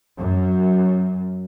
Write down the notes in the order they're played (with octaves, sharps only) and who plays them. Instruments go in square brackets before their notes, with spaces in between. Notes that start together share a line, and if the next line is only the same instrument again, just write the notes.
[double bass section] F#2